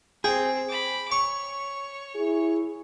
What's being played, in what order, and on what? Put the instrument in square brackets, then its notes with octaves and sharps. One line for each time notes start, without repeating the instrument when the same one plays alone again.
[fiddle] C4 [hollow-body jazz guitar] G#4 [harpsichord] G5
[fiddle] B5 D6
[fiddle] C#5 [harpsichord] C#6
[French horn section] E4 G#4